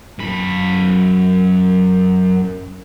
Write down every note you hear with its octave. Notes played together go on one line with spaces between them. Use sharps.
F#2 B5